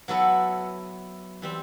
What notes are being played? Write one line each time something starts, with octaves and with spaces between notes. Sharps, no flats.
F#3 B3 E4 A4
E3 G3 C4